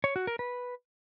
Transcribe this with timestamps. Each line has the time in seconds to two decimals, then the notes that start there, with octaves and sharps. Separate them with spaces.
0.04 C#5
0.16 F#4
0.27 A#4
0.39 B4